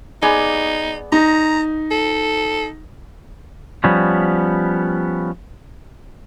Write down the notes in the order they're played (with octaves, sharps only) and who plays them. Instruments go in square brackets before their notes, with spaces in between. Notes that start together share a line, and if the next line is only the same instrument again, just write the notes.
[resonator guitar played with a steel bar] B3 G#4 D5 [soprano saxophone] D#4
[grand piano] D#4 [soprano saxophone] A#5
[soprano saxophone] A4
[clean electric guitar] F3 G3 B3 C#4